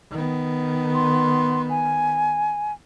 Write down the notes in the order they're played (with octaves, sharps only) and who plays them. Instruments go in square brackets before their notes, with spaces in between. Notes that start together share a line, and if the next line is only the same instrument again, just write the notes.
[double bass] D#3 B3
[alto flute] C6
G#5